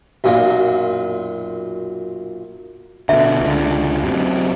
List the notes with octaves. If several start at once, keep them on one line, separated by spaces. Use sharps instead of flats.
B1 F#2 A#2
B2 D3 E5
C#2 D3
F#2 C3